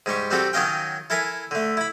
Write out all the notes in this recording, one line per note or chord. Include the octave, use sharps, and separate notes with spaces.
G#2 G3 G4 C#6
G3 C4 F#4 G4 A4
D#3 F#3 C#4 D#5 F5 G5
E4 A4 A#4 E5 G#5
D3 A3
E4 B5